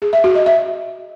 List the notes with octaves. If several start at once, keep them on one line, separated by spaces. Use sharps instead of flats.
G#4
E5
F#4
D#5
E5